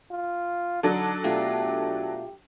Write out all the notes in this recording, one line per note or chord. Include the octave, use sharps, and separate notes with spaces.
F4
D3 F#3 D4 D#4 A4
B2 A3 F4 G4